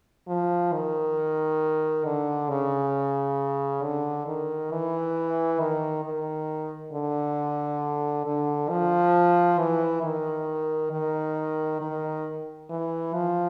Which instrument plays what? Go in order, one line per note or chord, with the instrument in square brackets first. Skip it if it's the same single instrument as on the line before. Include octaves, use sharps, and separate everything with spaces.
[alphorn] F3
D#3
D3
C#3
D3
D#3
E3
D#3
D#3
D3
D3
F3
E3
D#3
D#3
D#3
E3
F3